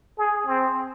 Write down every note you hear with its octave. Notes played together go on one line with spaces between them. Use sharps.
G#4
C4